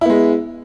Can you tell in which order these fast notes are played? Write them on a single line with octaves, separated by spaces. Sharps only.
E4 B3 G#3